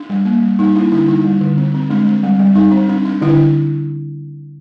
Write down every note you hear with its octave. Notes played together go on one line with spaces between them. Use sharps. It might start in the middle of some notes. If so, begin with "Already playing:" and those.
Already playing: D4
G3
A#3
G3
G3 D#4
A#3 D4 E4
D3 D4 E4
G3 D#4
G3
D3
C4
C4
G#3 D4
C4
G3
G3
G3 D#4
C4
D4
D4
D3 D4 E4